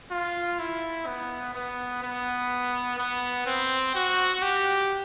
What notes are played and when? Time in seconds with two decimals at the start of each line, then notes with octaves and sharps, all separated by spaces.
0.11 F4
0.59 E4
1.07 B3
1.54 B3
2.03 B3
2.99 B3
3.46 C4
3.95 F#4
4.42 G4